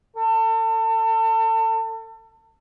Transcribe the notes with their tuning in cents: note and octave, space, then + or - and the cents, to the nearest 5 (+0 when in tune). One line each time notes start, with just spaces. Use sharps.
A4 +35